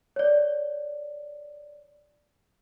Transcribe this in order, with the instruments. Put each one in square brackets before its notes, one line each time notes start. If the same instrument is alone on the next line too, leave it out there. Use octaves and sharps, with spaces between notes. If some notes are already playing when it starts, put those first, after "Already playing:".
[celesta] C#5 D5